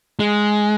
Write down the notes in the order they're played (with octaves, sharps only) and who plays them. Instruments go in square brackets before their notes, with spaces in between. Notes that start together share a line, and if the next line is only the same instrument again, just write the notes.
[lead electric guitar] G#3